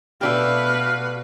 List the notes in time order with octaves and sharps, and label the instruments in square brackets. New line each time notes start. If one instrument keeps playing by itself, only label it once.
[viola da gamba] B2 B4 [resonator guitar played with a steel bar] A3 D4 G4 [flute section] F#4 F5 F6